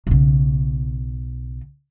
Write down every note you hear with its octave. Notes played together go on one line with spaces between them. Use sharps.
B1 C#3